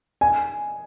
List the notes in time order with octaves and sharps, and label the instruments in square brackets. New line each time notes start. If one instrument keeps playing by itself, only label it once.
[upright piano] G#5